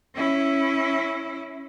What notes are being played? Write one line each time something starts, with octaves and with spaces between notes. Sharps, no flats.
C#4 E4